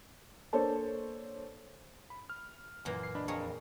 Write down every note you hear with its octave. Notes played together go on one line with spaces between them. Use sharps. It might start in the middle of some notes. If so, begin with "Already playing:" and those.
A#3 D4 A4 C5 C#5 A5
B5
F6
F#2 A#2 E3 A#3
C7
D4 D#5 B5
F2 G#4 A#4 C#5